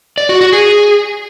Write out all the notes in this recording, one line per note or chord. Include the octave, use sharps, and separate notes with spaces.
D5
F#4
F#4
G#4